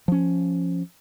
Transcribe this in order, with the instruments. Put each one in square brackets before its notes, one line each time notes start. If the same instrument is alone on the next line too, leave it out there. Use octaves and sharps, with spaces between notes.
[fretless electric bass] F3 C#4